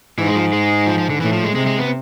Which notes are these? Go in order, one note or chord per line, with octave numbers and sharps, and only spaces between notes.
G#2 E3
G#3
F3
G#3
F3
F3
D3
A2 E3
F3
G#3
C3 G#3
G#3
B3